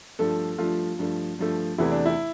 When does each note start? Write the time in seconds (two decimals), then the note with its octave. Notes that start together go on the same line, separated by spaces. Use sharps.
0.19 G2 F3 A3 A4
0.58 G2 F3 A3 F4
0.99 G2 F3 A3
1.39 G2 F3 A3
1.78 E2 C3 E3 A3 E4
1.92 D4
2.06 E4